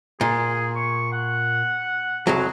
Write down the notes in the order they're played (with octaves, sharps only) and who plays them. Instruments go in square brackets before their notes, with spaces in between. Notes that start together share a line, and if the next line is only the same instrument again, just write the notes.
[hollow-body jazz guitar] A#2 [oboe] G#4
[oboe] C#6
F#5
[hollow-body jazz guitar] C2 F2 F#3 [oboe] G#4